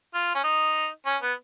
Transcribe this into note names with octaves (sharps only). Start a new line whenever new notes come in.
F4
C#4
D#4
C#4
B3